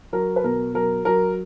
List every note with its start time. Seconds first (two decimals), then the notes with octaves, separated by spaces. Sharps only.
0.13 F#3 A#4
0.36 B4
0.44 B2 A#4
0.74 F#3 A#4
1.05 F#3 A#4